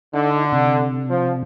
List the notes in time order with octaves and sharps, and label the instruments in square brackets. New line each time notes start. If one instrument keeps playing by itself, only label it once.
[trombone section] D3 [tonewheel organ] D#4
[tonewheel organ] C3
[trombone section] F3